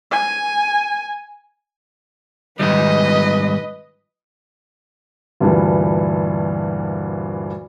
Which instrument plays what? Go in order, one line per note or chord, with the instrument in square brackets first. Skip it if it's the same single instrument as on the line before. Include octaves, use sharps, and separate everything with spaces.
[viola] G#5
[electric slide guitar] G#2 D#3 G3 [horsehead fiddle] B4 D#5
[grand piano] D2 G2 A#2 E3